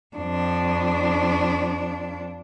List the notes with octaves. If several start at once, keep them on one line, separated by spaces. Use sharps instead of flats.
F2 D4